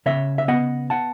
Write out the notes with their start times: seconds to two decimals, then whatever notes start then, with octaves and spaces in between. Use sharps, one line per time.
0.06 C#3 C#5 E5
0.38 E5
0.48 B3 D#5 F#5
0.90 F#5 A5